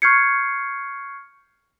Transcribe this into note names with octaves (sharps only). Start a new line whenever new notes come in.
C#6 F6 G6 G#6 C7 C#7